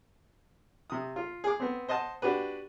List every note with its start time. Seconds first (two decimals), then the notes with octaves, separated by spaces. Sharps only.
0.90 C3 D#6
1.16 F4
1.44 G#4 D6
1.60 B3 C4
1.88 C5 D#5 F#5 A5
2.22 D4 F#4 G4 B4